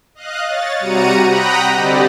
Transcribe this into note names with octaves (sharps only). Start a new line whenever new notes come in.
D#5 F5 F#6
C#5 A6
C3 G3 F#4 A#5 C#7 D#7
F#5 G5 A#5 B5 D#6 F#6
D3 C4 G4 D5 D#5